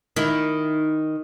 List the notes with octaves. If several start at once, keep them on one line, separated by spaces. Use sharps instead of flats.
D#3 E4